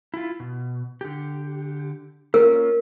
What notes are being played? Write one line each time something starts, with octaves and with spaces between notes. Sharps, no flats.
E4 F4
B2
D3 G4
A#3 C#4 F4 A#4